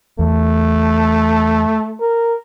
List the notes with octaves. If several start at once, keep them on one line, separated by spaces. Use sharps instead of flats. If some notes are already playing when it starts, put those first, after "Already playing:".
E2 A3
A#4